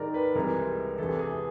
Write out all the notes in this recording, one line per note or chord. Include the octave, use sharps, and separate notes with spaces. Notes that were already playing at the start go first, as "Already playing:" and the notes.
Already playing: G#2 D#3 G#3 A#4 D5
B4
C2 C3 E3 G#3 A#4
E2 C3 E3 A4
G#4